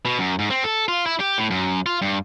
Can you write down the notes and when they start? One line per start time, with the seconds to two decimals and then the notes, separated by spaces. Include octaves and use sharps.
0.05 B2
0.19 F#2
0.39 G#2
0.50 C4
0.64 A4
0.88 F4
1.06 E4
1.20 G4
1.38 A2
1.51 F#2
1.86 F4
2.02 G2